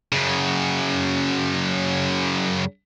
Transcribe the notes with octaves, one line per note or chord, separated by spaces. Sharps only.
F#2 C#3